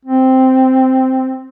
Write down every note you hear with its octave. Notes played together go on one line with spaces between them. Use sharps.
C4